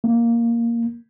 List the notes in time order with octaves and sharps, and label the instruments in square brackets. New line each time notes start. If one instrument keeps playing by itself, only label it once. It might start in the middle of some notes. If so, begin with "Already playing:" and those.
[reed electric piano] A#3